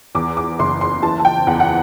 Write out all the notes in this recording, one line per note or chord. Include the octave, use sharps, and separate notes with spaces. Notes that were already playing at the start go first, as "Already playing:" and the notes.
E2 D6
D6
F#1 C6
C6
E3 A5
A5
G5
E2 F#5
F#5